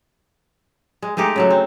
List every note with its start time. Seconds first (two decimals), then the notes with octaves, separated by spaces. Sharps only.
1.02 G#3
1.17 G#3 A3 D#4 G4
1.36 C#3 F#3 A3
1.50 C4